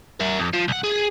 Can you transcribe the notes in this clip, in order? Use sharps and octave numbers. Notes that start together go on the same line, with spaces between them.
A#4 E5
F2
F3
C2 F#5
G#4